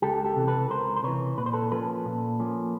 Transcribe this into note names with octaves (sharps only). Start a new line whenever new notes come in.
C#2 G4 A4
G4 A4
C3 E3
A4 B4
C#2 A#4 C5
C5
C3 E3 B4 C#5
A#2 B4
C5
A4 B4
F3 A#3 C#4 A4 B4
A#2
F3 A#3 C#4